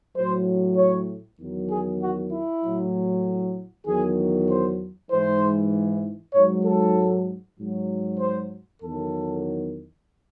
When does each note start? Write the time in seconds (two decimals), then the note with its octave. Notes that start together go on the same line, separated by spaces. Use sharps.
0.15 A2 F#3 C5
0.77 C#5
1.39 E2 D#3 F#3
1.70 G#4
2.01 F#4
2.32 E4
2.63 A2 F#3
3.86 E2 D#3 F#3 G#4
4.49 C5
5.10 G#2 E3 C5
6.34 G#2 F#3 C#5
6.65 A4
7.58 G#2 F#3
8.20 C5
8.81 E2 D#3 F#3 A4